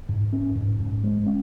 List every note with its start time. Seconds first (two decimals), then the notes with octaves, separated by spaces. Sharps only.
0.09 G#2
0.33 C#4
0.55 G#2
0.80 G#2
1.04 G#3
1.26 C#4